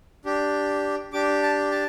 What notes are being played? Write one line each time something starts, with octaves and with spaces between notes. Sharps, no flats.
D4 G4
D4 G4 D6
A5
A5